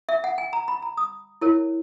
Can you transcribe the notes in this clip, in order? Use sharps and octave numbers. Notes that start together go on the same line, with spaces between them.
E5
F#5
G#5
A#5
B5
A#5
D#6
E4 A#4 C#5